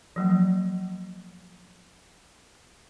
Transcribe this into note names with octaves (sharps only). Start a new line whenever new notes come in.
F3 F#3 A#3